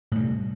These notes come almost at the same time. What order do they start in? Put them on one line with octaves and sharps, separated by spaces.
A2 G3 C3